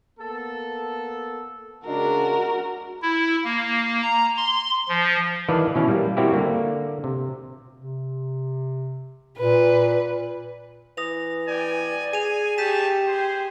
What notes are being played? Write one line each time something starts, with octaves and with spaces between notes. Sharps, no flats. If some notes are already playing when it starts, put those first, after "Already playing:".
A#3 B3 A4
C#3 G#3 D4 F#4 A#4
E4
A#3
A#5
C6
F3
D#3 E3 B4 D5 F5 A5
B2 E3 C#4 E4 F5
G3 A#3
G3 A#3 C4 E4 F#4 G4
D3 A#3
C3
C3
A#2 B4
E3 D#6 A#6 F7
D5 G5 G#5
G#4 G#5 D#7 F7
G3 A3 G4 A5 G6 B6 E7
G#4 C5